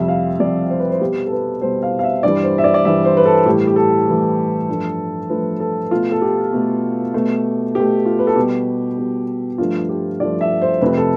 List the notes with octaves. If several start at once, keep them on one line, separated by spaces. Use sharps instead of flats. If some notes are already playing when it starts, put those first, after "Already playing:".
Already playing: F2 C3 G3 E5
F5
F2 C3 G3 D5
C5
B4
C5
B2 G3 G4
A4
B4
B2 G3 C5
F5
F5
E5
G2 E3 G3 D5
C5
E5
D5
D5
G2 E3 G3 E5
C5
B4
A4
A2 E3 G3 G4
G4
A4
A2 E3 G3
G2 F3 A3
G2 F3 A3 B4
A4
B2 A3 F4
A4
G4
B2 A3
B2 A3
B2 A3 G4
F4
B4
A4
B2 G3 G4
B2 G3
G2 F3 A3 F4
G4
G2 F3 A3 D5
E5
C5
F2 C3 F3 A3 B4
A4